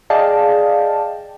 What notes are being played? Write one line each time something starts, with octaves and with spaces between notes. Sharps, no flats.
G#4 D5 D#5 F5 G5 A5